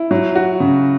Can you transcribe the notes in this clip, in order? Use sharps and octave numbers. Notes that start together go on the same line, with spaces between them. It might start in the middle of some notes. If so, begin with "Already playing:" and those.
Already playing: E4
F#3
F#4
C#3